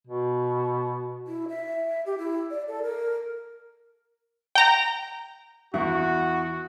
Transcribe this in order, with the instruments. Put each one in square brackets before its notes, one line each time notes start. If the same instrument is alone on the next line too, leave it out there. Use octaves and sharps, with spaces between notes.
[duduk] B2
[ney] E4
E5
G4
E4
D5
A4
A#4
[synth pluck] G5 A#5
[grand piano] E2 [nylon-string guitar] E4 [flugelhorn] F#4